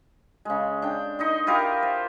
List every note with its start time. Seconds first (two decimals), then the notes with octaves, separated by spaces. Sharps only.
0.45 C#3 G#3
0.82 D4 G5
1.19 D#4 D#5 C6
1.47 E4 F4 G4 A#4
1.83 C5